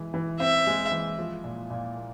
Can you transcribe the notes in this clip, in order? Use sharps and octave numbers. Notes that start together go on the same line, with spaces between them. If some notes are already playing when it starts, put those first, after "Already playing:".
Already playing: E3 G#3
E3
C4 E5
G#3
E3
F3
A#2
A#2
A#3